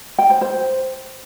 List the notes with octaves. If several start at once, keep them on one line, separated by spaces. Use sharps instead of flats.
G5
C5
C5